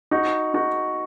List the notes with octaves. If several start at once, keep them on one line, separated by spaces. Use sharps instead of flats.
D#4 F#4
D#4 F#4